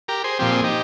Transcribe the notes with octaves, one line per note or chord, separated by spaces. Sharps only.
G4 A#4
G#4 C5
A#2 F3 C4 G4
G#4
D#4 G4